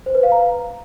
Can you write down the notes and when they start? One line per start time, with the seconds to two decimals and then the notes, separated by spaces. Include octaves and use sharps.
0.06 C5
0.15 B4
0.23 F5
0.32 A#5